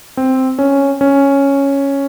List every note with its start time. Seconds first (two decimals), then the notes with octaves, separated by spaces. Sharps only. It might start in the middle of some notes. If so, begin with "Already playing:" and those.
0.17 C4
0.59 C#4
1.01 C#4